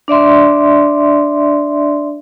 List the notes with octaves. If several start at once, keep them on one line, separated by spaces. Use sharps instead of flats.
D4 D5 E5 C6